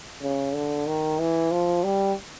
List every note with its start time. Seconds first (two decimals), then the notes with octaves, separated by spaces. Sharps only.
0.22 C#3
0.55 D3
0.87 D#3
1.19 E3
1.51 F3
1.84 G3